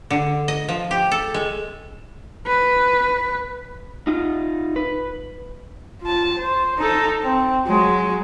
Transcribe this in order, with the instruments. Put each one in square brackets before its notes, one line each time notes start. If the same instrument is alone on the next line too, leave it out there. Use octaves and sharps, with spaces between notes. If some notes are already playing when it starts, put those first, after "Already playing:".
[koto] D3
D#5
F3
G4
A4
G#3
[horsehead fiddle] B4
[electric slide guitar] D#4 F4
B4
[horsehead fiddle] F4 A5
C5
D#4 A4
C4
F#3 G#3